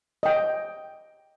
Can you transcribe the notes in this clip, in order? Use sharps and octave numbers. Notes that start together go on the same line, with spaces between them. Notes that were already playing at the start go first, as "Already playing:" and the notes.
D#5 G5